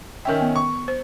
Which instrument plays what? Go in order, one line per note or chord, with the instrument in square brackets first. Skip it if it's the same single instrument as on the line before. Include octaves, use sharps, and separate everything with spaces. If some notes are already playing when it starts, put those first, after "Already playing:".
[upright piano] D#3 C#4 E5 [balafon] A#4 G5
[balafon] B3
[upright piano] C#6
[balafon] C5